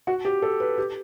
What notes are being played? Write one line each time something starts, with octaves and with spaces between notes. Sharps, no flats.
F#4
G4
A4
B4
G4